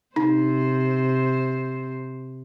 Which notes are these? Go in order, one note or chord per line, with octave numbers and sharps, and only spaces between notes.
C3 D#4 C5